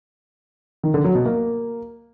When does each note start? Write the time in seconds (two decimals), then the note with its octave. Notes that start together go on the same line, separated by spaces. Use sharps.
0.84 D#3
0.94 D3
1.04 F#3
1.15 B2
1.25 A#3